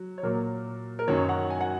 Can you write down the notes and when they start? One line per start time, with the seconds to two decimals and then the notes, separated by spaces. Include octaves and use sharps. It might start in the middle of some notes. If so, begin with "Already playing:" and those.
Already playing: F#3
0.18 C#5
0.23 A#2 F#3 A#4
0.99 A#4
1.08 F#2 D#3 F#3 C#5
1.29 F#5
1.50 G#5
1.61 F#5